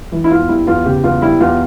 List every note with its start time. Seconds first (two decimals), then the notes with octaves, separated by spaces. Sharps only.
0.12 E3
0.24 E4
0.30 E2 F4
0.48 G3 E4
0.67 E2 F4
0.85 C#3 G4
1.04 E2 F4
1.22 G3 E4
1.40 E2 F4